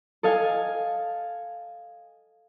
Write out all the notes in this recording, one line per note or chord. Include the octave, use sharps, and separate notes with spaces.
A4 D#5 F5 G#5